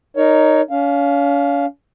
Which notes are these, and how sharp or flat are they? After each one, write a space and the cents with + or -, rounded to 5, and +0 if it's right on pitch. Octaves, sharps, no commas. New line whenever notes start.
D#4 -5 A#4 +0 C#5 +15
C#4 +40 F5 +0